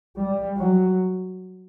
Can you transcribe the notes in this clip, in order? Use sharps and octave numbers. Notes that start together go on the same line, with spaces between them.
G3
F#3